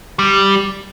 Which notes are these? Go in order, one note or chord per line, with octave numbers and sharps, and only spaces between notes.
G3